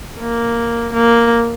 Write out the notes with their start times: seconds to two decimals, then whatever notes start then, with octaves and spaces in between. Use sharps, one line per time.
0.21 A#3
0.93 A#3